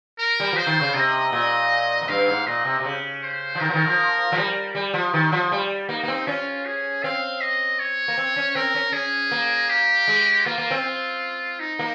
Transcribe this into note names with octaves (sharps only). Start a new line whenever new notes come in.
A#4
G3
F3 C5
D#3
C#3
C3 D#5
A#2
F2
G2 F5
G#2
A#2 D#5
C3
C3
C#3
C5
F3
D#3 A#4
F3
D#3
F3
F3
G3
G3
F3
D#3
F3
G3
A#3 D#4
A#3
C4
C#4 F4
G#4
C4 F5
D#5
C#5
A#3
C4
C#4
C4 A#4
C#4
C#4 G#4
A#3
G4
G#3
A#3 F4
A#3
C4
D#4
A#3